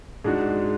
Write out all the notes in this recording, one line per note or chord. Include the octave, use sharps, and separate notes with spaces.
G#2 G#3 D4 F#4